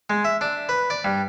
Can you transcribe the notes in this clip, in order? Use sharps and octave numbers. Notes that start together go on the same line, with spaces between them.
G#3
E5
D4
B4
D5
G2